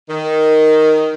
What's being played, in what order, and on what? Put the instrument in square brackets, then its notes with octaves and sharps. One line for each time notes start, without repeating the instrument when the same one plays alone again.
[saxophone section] D#3